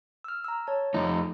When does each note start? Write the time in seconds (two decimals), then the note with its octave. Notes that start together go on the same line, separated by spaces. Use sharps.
0.24 E6 F6
0.44 A#5 E6
0.67 C#5 A5
0.94 F2 A3 D#4